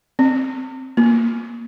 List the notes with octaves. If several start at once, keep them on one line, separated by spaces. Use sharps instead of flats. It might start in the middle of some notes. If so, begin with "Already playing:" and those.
C4
A#3